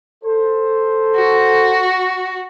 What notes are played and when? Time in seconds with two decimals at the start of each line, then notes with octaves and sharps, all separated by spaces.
0.24 A4 C5
1.16 F#4